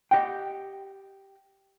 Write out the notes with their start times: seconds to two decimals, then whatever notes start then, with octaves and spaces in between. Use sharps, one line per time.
0.11 G4 D#5 F#5 G5